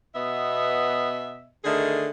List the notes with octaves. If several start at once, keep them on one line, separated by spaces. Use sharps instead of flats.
B2 B3 D#5 E5
D3 D#3 A3 G#4